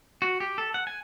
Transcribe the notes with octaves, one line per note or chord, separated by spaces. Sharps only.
F#4
G4
A4
F#5
G#5